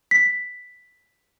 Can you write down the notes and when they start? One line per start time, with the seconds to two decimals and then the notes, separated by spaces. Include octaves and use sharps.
0.11 B6